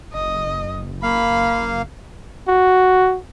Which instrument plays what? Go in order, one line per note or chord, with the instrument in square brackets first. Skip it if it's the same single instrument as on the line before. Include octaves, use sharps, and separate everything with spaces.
[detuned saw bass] F#1 [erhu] D#5
[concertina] A#3 F5 [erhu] B5
[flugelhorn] F#4